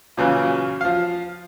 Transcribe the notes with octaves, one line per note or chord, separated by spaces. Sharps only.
A#2 C#3 E3 F#3
F3 F5